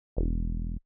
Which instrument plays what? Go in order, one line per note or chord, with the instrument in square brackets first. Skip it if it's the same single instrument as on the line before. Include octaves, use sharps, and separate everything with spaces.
[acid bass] E1